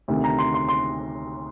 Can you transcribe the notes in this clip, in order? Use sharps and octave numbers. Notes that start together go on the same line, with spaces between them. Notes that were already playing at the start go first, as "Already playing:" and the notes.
D2 C3 D#3
A#5
C6
C6
C6